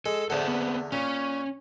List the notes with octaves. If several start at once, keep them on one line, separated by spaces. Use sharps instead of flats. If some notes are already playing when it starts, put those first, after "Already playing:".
G#3 A4
E2 D3 A4 C5 D5
B3 C4
A#2 C#4